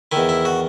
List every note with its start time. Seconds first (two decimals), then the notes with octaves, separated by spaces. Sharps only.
0.12 E2 D#3 E4
0.29 E4
0.45 F#4